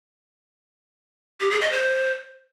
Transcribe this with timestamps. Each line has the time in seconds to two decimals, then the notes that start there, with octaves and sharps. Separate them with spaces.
1.41 G4
1.51 G#4
1.61 D#5
1.72 C5